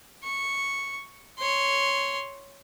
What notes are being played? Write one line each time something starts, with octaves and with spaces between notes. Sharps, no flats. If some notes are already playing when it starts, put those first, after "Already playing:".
C#6
C#5 C6